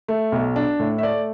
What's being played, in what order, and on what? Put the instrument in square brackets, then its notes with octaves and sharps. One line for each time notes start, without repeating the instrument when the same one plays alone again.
[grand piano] A3
B1
D4
A2
E5
A3 D5